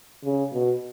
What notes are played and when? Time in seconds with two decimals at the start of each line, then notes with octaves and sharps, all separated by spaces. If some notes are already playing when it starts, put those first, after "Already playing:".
0.24 C#3
0.53 B2